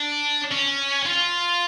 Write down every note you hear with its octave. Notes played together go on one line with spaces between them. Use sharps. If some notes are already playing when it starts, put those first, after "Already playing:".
Already playing: D4
C#4
F4